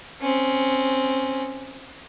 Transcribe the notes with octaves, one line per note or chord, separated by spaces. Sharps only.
C4 C#4